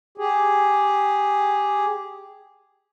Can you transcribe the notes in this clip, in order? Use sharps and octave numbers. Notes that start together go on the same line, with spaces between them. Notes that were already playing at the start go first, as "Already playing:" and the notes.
G4 G#4